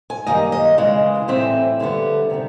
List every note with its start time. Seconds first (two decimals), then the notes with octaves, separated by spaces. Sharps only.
0.10 G#5
0.27 F#2 D#3 G3 A#3 D#5
0.52 D#5
0.78 C#3 E3 G#3
1.28 A2 E3 G3 C4 E5
1.79 F2 D3 G3 B3
2.30 C3 D#3 G3 C4